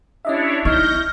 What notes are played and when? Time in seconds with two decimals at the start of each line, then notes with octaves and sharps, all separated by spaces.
0.25 C#4 D4 E4 G4 C#5 D#5 E5
0.65 D#4 E4 D#5 C#6 F6 G6 A#6